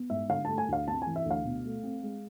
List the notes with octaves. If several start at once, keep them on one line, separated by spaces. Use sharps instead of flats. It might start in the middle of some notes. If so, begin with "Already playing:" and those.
Already playing: B3
G#2 E5
D3 F5
A3 A5
G#5
D2 F5
C3 A5
E3 G#5
E5
D2 F5
B2
A3
C4
G#3